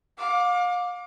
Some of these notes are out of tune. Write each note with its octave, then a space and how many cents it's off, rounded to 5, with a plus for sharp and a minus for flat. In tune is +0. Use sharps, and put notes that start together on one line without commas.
F5 +35 D6 +0